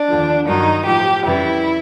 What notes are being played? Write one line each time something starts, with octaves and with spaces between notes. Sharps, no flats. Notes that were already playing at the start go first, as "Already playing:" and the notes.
Already playing: D4
D#2 D3 F3
G2 D#3 F#3 D#4
A2 F3 G4
F2 C#3 E3 G3 E4